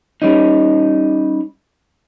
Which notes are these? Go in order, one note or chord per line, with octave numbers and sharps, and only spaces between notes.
G3 C#4 D#4